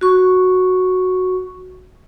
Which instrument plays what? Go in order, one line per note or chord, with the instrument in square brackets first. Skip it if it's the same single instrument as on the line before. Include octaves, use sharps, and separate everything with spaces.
[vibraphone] F#4 C#6